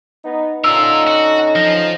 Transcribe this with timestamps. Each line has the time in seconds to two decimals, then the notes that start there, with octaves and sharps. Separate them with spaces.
0.23 B3 D#4
0.64 D3 C#4 D#4 F4 A#4 E6
1.07 F#4
1.55 F3 A#6